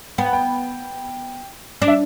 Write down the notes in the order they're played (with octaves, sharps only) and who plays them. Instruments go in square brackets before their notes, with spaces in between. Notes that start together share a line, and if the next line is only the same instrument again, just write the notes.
[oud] B3 [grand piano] G5
[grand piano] F#5
G5
[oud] D4
[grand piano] E5